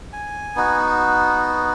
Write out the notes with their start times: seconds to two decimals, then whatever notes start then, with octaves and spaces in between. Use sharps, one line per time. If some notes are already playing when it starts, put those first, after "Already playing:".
0.13 G#5
0.55 B3 D#4 F#4